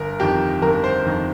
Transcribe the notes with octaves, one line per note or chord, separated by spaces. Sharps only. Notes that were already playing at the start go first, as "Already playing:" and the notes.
Already playing: G1 A#4
F2 D#3 G4
G1 A#4
C5
F2 D#3